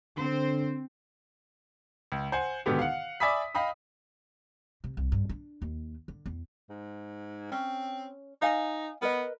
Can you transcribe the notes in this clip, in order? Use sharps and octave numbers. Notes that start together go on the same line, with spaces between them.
D3 C4 C5
C#2
C5 F#5 G#5
G#2 B2 D3 D#3 B3 G4
F5 F#5
D5 E5 G#5 B5 D#6 B6
D#5 F5 G5 B5 D#6
C3
C2
G2
D4
D#2
D3
E2
G#2
C4 C#4
D#4 D#5 F5 G#5
B3 A#4 B4 D#5